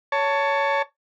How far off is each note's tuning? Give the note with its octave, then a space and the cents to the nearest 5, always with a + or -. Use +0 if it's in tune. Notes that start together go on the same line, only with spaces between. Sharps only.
C#5 +15 A5 +15